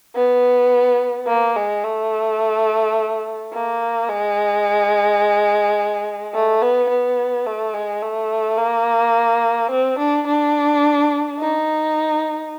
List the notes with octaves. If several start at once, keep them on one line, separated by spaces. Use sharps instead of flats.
B3
A#3
G#3
A3
A#3
G#3
A3
B3
B3
A3
G#3
A3
A#3
C4
D4
D4
D#4